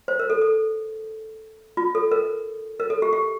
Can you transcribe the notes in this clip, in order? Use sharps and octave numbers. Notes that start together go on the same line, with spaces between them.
C5
A#4
A4
A4
F4
A4
A#4
A#4
A4
G4
G4